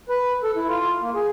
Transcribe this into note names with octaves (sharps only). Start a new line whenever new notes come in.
B4
A4
E4
F4
A#3
G#4